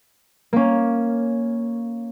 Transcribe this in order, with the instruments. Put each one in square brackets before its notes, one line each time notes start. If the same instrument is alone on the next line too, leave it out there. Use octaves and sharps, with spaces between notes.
[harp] A#3 C#4